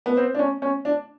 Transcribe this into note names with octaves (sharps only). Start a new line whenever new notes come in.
B3
C4
D4
C#4
C#4
D4